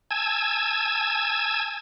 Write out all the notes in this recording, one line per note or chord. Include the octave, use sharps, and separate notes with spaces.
G#5 A5 E6 G#6